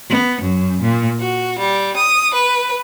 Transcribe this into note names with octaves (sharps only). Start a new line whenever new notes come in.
B3
F#2
A#2
F#4
G3
D#6
B4